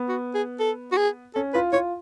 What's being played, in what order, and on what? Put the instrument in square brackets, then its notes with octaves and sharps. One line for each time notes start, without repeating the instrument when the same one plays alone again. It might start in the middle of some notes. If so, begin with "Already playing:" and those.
Already playing: [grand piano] B3
[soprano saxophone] F#4
G#4
A4
F#4
G#4
[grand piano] C#4 [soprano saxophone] A4
[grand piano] F4 [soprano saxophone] B4
[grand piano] F4 [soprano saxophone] C#5